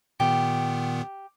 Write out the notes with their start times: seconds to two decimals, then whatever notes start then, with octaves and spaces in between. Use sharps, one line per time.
0.20 A#2 D#3 B3 G4